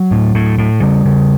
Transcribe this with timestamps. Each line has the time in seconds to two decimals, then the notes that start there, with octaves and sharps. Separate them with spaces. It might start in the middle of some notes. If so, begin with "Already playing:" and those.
Already playing: F#3
0.11 A2
0.35 A2
0.58 A2
0.81 C#3 G3
1.05 C#3